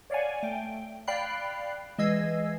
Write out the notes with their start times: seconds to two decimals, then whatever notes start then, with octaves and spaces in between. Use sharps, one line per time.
0.10 C#5 D5 F5 F#5 G#5
0.43 A3 G5
1.07 D5 F5 G5 B5 F#6 C7
1.98 E3 G#3 D#5 E6 G#6 C7